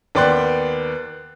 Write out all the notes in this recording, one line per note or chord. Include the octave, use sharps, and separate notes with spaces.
D#2 B3 D5 G5 C6 F#6